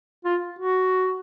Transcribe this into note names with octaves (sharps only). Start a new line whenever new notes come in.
F4
F#4